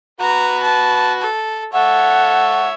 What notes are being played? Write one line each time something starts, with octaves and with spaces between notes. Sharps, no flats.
F#4 B4 A#5
A5
A4
A4 C#5 E5 F#5